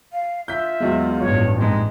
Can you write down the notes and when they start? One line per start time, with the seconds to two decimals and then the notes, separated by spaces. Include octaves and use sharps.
0.13 F5
0.48 F4 E5 G6 B6
0.80 E2 F#3 G#3
1.20 A1 G2 C#5
1.56 F2 G#2 G#3